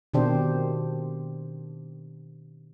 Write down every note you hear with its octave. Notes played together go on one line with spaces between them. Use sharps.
B2 D#3 C4 D4 G4 C5